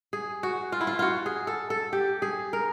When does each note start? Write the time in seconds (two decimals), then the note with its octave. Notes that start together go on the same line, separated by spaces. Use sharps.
0.13 G#4
0.43 F#4
0.72 F4
0.81 E4
0.87 F4
0.99 F4 F#4
1.26 G#4
1.47 A4
1.70 A4
1.93 G4
2.22 G#4
2.53 A#4